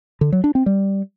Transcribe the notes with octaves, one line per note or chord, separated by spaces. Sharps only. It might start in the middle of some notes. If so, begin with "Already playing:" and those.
D3
F#3
D4
C4
G3